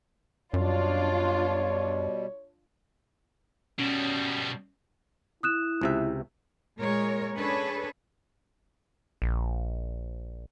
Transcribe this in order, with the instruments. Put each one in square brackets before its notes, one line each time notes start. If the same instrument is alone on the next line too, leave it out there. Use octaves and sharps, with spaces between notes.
[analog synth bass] F#2 [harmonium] B2 G3 [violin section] D4 F4 [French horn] C#5
[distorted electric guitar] B2 G3 [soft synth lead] C#4
[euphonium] E4 [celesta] D#6 F#6 E7
[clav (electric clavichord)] C#2 C3 E5
[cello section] A#2 G#3 A#4 C#5
C#4 D4 G#4 A4 B4 C#5
[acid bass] A#1